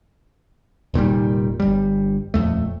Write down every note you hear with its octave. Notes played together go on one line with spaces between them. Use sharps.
F1 A#2 D#3 G3
G1 G3
D#1 F2 A3